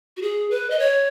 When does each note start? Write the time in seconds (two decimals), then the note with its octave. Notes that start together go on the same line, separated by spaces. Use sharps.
0.17 F#4
0.22 G#4
0.51 B4
0.70 D#5
0.79 C#5